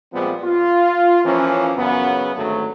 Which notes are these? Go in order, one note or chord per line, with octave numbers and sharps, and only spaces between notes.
A#2 F3 G3 G#3 B3 C4
F4
E3 F3 A#3 C#4
F#2 C#3 B3
G#1 D2 F#3 A3